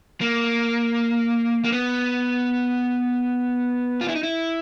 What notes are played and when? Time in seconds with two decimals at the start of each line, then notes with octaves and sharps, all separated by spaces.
0.21 A#3
1.64 A#3
1.72 B3
4.01 F4
4.08 E4
4.15 D#4
4.23 E4